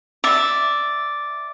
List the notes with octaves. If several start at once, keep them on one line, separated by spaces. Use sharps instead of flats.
D5 E5